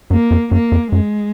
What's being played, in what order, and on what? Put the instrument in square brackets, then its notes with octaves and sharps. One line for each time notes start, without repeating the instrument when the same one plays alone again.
[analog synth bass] F#2 [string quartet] A#3
[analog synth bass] F2
[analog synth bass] F#2 [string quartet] A#3
[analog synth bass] F2
[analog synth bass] F#2 [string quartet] G#3